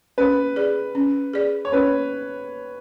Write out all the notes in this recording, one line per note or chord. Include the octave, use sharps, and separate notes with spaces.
C#4 B4
G#4 D5
C#4
G#4 D5
C#5
C#4 B4